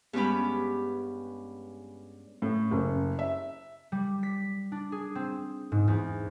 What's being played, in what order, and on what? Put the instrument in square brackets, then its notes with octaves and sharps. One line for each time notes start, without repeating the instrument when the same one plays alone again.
[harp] G2 G#3 B3 C#4 G4 B5
[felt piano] A2
F#1
E5
[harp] G3
B6
D4
G#4
C4
G#2
E2